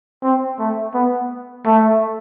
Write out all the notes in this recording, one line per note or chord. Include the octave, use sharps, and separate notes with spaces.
C4
A3
B3
A3